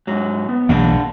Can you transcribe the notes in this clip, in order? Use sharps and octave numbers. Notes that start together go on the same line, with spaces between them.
G#2 F#3
B3
B1 E3 A#3 D4 F5 F#5